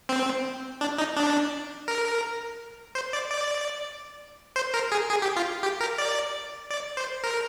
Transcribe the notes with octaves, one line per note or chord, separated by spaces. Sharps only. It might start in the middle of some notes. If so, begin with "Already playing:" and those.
C4
D4
D#4
D4
A#4
C5
D5
D5
C5
A#4
G#4
G#4
G4
F4
G4
A#4
D5
D5
C5
A#4